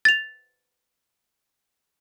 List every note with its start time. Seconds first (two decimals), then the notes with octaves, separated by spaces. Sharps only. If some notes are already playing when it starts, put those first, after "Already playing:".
0.05 A6 F7